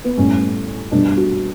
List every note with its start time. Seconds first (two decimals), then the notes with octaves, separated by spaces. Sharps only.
0.05 B3
0.18 A2 G3 C#4
0.92 B2 G3 D4
1.17 F#4